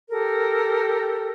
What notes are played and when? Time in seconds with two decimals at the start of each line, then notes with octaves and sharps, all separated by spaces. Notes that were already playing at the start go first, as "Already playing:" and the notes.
0.10 G4 A4 A#4